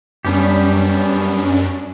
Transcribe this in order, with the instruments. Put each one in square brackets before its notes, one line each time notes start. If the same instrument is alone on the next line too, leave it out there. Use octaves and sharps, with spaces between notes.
[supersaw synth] F#2 C#4 D4 [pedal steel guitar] G3 B3 G4